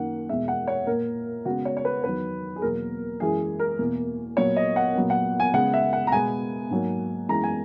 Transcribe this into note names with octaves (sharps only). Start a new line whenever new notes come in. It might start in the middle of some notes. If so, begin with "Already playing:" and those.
Already playing: F#2 D#3 A#3 F#5
E2 B2 G#3 E5
F#5
C#5
A#2 A#3 A#4
C#3 G#3 B3 F#4
C#5
C#5
B4
E2 D#3 F#3 B4
G#4
E2 B2 F#3 A#3 A#4
F#2 E3 G#3 G#4
A#4
E2 B2 A#3
A#2 F#3 B3 C#5
D#5
F#5
A#2 F#3 B3
F#5
G#5
C#3 G#3 B3 F#5
E5
F#5
A#5
B2 G#3 B3 G#5
G#2 F#3 A#3
F#2 E3 G#3 B3 A#5
G#5